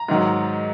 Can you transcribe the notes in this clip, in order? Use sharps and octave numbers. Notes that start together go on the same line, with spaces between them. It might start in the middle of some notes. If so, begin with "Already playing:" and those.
Already playing: A#5
G#2 D#3 F#3